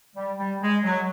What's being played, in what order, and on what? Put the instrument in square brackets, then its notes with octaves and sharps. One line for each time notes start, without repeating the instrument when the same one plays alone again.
[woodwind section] G3
G3
G#3
F#3